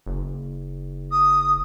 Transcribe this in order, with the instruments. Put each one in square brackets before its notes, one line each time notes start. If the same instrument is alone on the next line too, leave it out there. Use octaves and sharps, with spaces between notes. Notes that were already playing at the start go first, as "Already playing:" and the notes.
[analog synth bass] F#1
[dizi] D#6